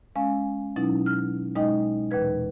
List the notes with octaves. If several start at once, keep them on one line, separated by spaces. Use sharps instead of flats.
G#3 C#4 F5 G#5
B2 F#3 C#4 D#4 E4
F6
B2 G#3 D#4 D#5 G5
D#2 A#2 E3 B4 G#6